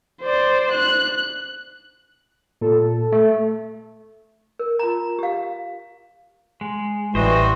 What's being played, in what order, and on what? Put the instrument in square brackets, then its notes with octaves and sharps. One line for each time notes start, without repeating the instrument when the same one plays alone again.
[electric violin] C5 D5
F#6
[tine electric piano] A#2 [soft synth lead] A4
[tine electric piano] A3
[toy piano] A#4
F4 A#5
G4 F5
[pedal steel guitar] G#3
[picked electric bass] A1 [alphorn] E3 [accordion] G3 F#4 [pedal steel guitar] C5 D#5